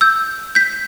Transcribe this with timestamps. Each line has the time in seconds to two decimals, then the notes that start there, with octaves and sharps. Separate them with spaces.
0.01 E6 G6
0.55 G6 B6